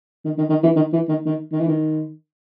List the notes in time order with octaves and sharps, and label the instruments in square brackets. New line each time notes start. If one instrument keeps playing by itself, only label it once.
[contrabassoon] D#3
D#3
D#3
E3
D#3
E3
D#3
D#3
D#3
E3
D#3